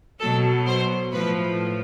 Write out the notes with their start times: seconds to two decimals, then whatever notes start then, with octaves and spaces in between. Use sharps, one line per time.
0.19 B2 F#3 A4
0.67 C5
1.12 A2 F3 B4